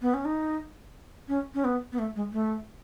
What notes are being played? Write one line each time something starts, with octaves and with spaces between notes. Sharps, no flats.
B3
C#4
D#4
C#4
C#4
B3
B3
A3
G#3
A3